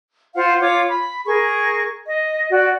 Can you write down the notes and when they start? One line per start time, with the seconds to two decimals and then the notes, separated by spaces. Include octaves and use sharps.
0.35 F4 C5 F5 F#5
0.60 F4 C#5 D6
0.89 B5
1.26 G#4 A#4 C#6
2.05 D#5
2.49 F#4 D5